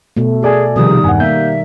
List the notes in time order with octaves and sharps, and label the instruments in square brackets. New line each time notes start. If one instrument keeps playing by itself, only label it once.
[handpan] B2 A3
[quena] G#4 [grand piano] A4 D5 G#5
[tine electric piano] C3 F3 G#4 [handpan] D#3 G3 A#4 [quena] D#6
[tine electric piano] E2 G2 [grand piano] F#5 G#5
[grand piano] A#3 [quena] E5 [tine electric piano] G6